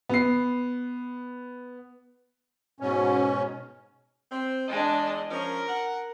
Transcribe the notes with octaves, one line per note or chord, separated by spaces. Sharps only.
B3 C7
G#2 B2 C#4
C4
E2 G#3 D4 D#5
F3 C#4 A#4
F#5